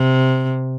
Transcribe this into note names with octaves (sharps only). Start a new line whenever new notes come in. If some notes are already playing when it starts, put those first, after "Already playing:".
Already playing: C3